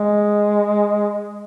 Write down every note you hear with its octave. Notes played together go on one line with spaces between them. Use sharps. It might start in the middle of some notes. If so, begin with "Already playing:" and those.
Already playing: G#3